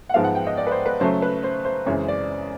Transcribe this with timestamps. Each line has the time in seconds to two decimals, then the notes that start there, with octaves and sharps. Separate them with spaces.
0.09 F#5
0.14 G#2 F3 G#3 B3 F5
0.24 F#5
0.35 G5
0.47 D#5
0.57 D5
0.67 B4
0.71 C5
0.86 B4
1.00 C#3 F#3 A3 C5
1.22 B4
1.44 C5
1.65 C5
1.86 F#2 C#3 E3 G#3 C4 C#5
2.08 D5